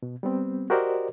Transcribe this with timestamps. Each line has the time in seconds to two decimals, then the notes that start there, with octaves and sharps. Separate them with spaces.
0.02 B2
0.23 G3 B3 C4
0.70 F#4 G4 A#4 C5 D5 D#5